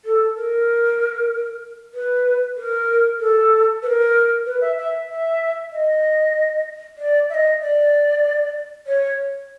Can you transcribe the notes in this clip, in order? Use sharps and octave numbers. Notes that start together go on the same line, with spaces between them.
A4
A#4
B4
A#4
A4
B4
A#4
B4
E5
E5
E5
D#5
D5
E5
D#5
D5
C#5